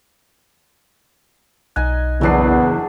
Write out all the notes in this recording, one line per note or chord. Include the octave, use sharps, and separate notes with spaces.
B1 D#4 D#5 G#5 F#6
F#1 E2 F#3 B3 D4 G#4 C7